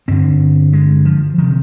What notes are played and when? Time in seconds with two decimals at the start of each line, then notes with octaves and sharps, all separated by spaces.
0.08 G2 D3 C4
0.73 G#3
1.05 F3
1.38 C3 D#3